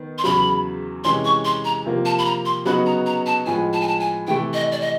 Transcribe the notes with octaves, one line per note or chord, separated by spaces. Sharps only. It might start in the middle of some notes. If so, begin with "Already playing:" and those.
Already playing: D#3 B3
C6
E2 C#3 F#3 B5
C3 E3 G#3 C#4 C6
C#6
C6
A#5
C3 F3 A#3
A5
B5
A#5
C6
C#3 F#3 B3 D#4 F#4 B5
A#5
A#5
A5
A2 F3 G#3 G#5
A5
G#5
A5
G#5
C3 E3 A3 G5
D#5
D5
D#5